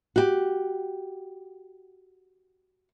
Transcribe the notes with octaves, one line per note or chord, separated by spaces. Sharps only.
F#4 G4